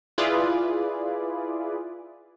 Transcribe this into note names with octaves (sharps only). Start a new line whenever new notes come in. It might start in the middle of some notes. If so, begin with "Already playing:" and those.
E4 F4 G#4 B4 D5